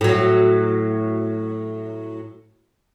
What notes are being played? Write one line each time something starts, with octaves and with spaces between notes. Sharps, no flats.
A2 F#3